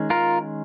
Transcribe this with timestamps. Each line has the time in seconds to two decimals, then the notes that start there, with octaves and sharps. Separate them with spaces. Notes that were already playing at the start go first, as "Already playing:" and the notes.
Already playing: D#3 G#3 C#4
0.10 F4 A#4